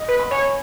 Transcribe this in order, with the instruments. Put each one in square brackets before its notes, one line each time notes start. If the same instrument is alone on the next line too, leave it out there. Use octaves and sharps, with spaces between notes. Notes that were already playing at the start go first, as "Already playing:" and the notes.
Already playing: [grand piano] D#5
[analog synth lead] B4
[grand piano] B5
[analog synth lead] C#5 [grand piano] G#5